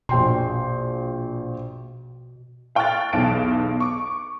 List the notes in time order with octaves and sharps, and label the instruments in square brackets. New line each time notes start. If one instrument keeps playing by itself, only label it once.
[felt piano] A#1 G5 C6 [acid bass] B2
[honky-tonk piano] F5 G5 C#6 F6 F#6 A6
B1 E2 F5 A5 D7
C#6 D6